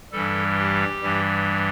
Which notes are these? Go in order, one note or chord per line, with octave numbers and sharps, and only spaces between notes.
G2 E3 G3 A4
G4
G2 E3 G3